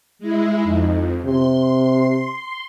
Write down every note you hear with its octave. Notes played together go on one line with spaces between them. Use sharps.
G#3 E4
F2 D#4
C3 C6